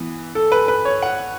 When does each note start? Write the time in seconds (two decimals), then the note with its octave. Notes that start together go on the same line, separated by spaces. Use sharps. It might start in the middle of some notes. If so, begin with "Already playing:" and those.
Already playing: E3 B3
0.35 A4
0.52 B4
0.68 B4
0.85 C#5
1.02 F#5